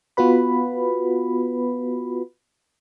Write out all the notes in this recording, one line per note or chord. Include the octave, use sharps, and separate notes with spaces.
B3 F4 F#4 B4 B5